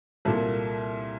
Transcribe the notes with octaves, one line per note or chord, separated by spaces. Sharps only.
C2 A#2 A4